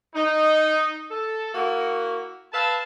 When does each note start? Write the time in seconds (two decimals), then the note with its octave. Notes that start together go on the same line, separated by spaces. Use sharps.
0.15 D#4
1.11 A4
1.54 A#3 E4 F#4
2.53 B4 E5 F5 A5